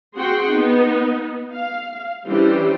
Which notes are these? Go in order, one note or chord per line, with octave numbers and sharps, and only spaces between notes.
C4 F#4 G#4 F#5 G5 C6
B3 D#4
F5
E3 G3 C#4 D4 G4 C5